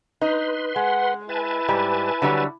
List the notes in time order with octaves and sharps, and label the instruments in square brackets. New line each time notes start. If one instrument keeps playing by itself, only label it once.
[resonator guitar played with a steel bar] D#4 [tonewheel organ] B4 C6
[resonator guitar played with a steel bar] G#3 [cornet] F#5
[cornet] E4 [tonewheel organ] B4 G#5 A5
[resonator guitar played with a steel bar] G#2 G3
D3 F#3 G3